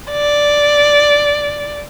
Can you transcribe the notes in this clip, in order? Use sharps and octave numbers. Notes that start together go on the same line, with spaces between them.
D5